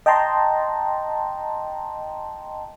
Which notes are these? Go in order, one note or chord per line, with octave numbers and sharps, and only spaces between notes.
D#5 G5 A5 A#5 C6